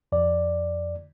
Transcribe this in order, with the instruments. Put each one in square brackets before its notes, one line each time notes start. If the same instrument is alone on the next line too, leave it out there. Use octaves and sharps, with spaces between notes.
[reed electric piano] F2 D5